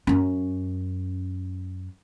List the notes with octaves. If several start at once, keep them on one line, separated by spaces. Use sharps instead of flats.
F#2 C#4